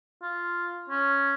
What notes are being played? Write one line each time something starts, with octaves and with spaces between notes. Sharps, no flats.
F4
C#4